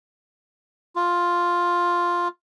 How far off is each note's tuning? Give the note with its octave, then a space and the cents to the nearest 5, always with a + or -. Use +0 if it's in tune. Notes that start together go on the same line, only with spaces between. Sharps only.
F4 +5